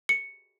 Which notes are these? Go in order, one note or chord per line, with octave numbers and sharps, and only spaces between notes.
C#7